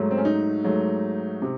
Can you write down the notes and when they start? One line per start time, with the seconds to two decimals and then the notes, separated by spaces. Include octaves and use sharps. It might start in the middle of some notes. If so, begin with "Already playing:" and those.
Already playing: G#2 F#3 A3
0.11 C4
0.18 C#4
0.25 D#4
0.64 G#2 F#3 A3
1.42 C3